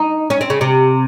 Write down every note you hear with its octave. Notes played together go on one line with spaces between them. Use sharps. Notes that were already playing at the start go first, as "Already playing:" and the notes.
Already playing: D#4
C#4
C4
C#3
C3